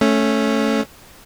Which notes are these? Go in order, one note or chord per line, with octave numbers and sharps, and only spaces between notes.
A3 C#4